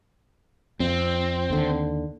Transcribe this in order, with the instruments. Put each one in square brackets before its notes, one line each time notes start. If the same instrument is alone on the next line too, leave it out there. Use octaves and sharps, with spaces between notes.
[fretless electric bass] F2 [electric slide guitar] C4
[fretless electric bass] D#2 D3